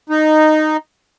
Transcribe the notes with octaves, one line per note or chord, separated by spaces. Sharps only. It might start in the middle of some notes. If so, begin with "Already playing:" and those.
D#4